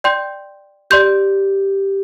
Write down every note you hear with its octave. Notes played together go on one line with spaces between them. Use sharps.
D5 G5 C6 G6
G4 D5 C6 G6